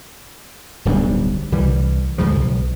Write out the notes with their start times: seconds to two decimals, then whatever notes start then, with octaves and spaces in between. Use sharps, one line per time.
0.85 D1 B1 G3 D4
1.52 C2 E3 G3
2.18 D2 G#2 C#3 F3
2.36 B1